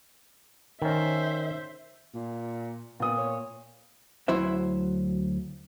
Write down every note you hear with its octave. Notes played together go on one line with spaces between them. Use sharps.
D#3 C#4 C5 E5
A#2
A#2 B3 D#6
C#5
D2 F#3 E4 C5 E5